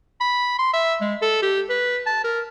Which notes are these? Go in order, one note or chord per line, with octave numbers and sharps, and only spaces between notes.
B5
C6
E5
G#3
A4
G4
B4
A5
A#4